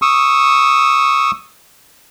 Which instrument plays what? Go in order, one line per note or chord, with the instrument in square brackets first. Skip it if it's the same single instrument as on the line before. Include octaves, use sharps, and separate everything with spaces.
[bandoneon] C#6 D#6 E6